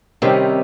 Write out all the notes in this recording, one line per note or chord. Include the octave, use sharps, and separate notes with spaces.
C3 D#3 G3 C#4 G4